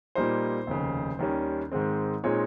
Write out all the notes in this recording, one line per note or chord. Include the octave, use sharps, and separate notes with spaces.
A#2 G3 A#3 D#4 C5
F1 D#2 C#3
D#2 D#3 G3 C#4
G#2 D#3 G#3 C4
A#2 G#3 C4 D#4 C#5